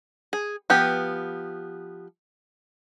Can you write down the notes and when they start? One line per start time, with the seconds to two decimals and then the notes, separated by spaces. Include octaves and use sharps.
0.33 G#4
0.70 F3 B3 G4